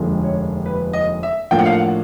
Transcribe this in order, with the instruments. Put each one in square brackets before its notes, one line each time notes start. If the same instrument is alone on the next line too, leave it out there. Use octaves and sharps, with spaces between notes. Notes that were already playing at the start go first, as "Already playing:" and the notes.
Already playing: [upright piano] F1 D#2 D3 F3 G#3
C#5
B4
D#5
E5
A2 F3 A#3 D4 F4 G5
F#5
F5
F#5